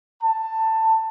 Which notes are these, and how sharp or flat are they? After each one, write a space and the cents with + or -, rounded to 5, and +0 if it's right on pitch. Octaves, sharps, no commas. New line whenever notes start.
A5 +15